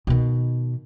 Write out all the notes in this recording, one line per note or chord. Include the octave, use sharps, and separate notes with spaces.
B2 D#3